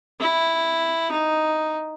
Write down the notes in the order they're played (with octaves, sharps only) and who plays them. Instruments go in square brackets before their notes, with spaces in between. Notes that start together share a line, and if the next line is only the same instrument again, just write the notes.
[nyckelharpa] E4
D#4